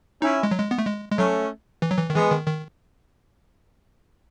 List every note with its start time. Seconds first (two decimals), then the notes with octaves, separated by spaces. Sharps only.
0.22 C#4 D#4 E4
0.43 G#3
0.51 F#3
0.59 G#3
0.71 B3
0.78 A3
0.86 G#3
1.11 G#3
1.18 F#3 A3 C#4
1.82 E3
1.91 F#3
1.98 E3
2.10 D#3
2.15 E3 G#3 B3
2.31 D#3
2.47 D#3